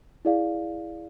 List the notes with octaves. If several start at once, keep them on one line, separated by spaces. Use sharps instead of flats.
E4 G#4 D5 F5